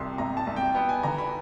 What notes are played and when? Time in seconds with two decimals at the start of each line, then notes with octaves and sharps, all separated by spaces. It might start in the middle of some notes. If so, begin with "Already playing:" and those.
Already playing: C2 C3 C6
0.18 C2 A#5
0.37 A5
0.47 C2
0.56 G5
0.75 B3 G5
0.89 G#5
1.03 D3 A#5
1.18 B5